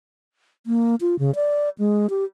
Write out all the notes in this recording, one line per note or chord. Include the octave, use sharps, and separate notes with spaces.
A#3
F4
C#3
D5
G#3
G4